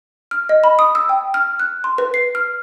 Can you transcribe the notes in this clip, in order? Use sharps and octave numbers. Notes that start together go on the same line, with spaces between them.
F6
D#5
B5
D#6
E6
G5
F6
F#6
C6
B4
C7
F6